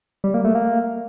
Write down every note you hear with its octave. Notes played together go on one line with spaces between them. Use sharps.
G3
A#3
A3
A#3